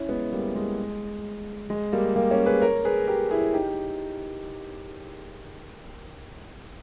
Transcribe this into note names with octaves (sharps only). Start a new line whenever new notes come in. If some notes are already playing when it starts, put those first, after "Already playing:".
Already playing: C#4 E4
G#3 B3
G3 A#3
G#3
G#3
G3 A#3
G3 A#3
A#3 C#4
G#4 B4
A#4 C#5
G#4 B4
G4 A#4
E4 G#4
D#4 G4